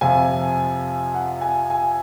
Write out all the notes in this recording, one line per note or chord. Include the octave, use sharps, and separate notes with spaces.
F2 C3 F3 G#5
F#5
G#5
G#5